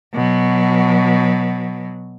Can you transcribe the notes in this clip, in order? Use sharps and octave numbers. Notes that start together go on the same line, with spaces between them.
B2 F#3